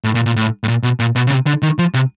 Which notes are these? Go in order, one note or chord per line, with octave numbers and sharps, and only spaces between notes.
A2
A#2
A#2
A2
A2
A#2
B2
A#2
B2
C#3
C3
D3
D#3
F3
C3